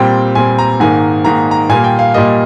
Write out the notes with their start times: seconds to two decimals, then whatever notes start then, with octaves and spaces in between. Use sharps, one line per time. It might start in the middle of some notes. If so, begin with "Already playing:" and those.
Already playing: A#2 G3 C4 G5
0.35 A#2 G3 C4 G#5
0.58 A#5
0.80 G#2 D#3 A#3 G#5
1.25 G#2 D#3 A#3 A#5
1.51 A#5
1.69 A#2 G3 A#3 G#5
1.84 G5
1.99 F5
2.14 A#2 G3 A#3 D#5